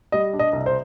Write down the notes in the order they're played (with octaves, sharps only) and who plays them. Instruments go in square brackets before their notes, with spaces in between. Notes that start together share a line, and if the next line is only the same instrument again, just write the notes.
[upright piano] G3 D#5
D4
D#5
C2
C5